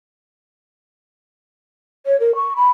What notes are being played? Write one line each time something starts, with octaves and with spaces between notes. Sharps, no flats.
C#5
A#4
C#6
B5